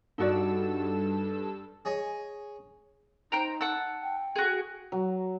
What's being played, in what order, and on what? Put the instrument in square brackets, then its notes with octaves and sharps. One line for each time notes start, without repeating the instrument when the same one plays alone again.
[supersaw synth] G2 A4 E6 [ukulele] D#4 F#4 D5
[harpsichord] G#4 C#5 D#5 G#5
[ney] D#4 [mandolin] C5 G5 A#5
[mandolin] F#5 A5 E6
[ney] G5
[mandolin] F#4 G#4
[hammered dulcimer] F#3